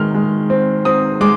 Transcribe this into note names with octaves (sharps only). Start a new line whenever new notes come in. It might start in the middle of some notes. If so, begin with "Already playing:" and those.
Already playing: D#3 G#3 F6
G#3
C4
C4 D#6
G#3 D6